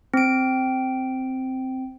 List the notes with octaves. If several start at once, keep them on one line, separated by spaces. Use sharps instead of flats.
C4 D7